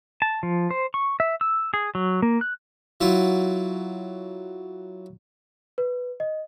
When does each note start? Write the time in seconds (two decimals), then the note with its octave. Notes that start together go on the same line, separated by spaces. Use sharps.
0.22 A5
0.43 F3
0.71 C5
0.94 C#6
1.20 E5
1.41 E6
1.74 G#4
1.95 F#3
2.22 A#3
2.41 F#6
3.01 F#3 E4 F4
5.78 B4
6.20 D#5